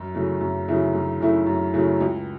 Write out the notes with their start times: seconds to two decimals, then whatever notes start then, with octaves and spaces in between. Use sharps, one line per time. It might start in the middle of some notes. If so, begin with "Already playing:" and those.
Already playing: F#2
0.15 C#3 F#3 A3 E4
0.41 F#2
0.68 C#3 F#3 A3 E4
0.94 F#2
1.20 C#3 F#3 A3 E4
1.47 F#2
1.74 C#3 F#3 A3 E4
2.00 C#2